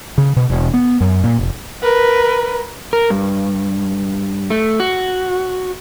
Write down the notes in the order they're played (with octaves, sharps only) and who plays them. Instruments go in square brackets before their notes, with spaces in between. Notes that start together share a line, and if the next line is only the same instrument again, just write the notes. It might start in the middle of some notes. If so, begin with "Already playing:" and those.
[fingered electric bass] C#3
B2
E1
B3
F#2
A#2
F1
[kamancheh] A#4 B4
[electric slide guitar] A#4
G2
A3
F#4